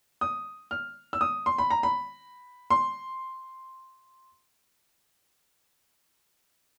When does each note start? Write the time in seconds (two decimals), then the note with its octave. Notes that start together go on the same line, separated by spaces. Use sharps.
0.21 D#6
0.71 F6
1.13 E6
1.21 D#6
1.46 C6
1.58 B5
1.70 A#5
1.83 B5
2.70 C6